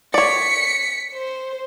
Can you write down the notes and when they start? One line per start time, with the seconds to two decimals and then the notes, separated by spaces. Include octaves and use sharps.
0.14 C#5 D5 B6 C#7
1.13 C5